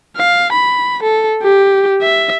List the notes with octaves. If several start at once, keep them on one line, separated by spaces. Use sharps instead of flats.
F5
B5
A4
G4
E5